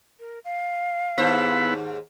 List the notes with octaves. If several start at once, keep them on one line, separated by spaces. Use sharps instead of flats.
A#4
F5
D#2 G#2 B3 E4 B4 C5